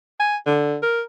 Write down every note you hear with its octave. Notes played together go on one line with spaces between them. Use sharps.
G#5
D3
A#4